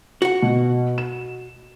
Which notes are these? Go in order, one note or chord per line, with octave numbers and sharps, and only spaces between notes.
F#4 F#5
B2
E7